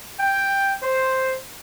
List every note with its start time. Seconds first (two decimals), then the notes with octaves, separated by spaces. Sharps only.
0.20 G5
0.83 C5